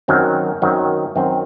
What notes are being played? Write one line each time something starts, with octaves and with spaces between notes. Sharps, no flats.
F#2 D#3 F#3 C4
F#2 D#3 F#3 C4
F#2 D#3 F#3 C4